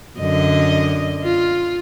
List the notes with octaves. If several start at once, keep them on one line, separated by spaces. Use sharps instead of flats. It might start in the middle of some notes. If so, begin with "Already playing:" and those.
F#2 D3 D#5
F4